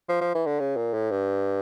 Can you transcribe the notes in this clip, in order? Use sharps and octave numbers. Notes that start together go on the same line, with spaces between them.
F3
F3
E3
D3
C#3
A#2
A2
G2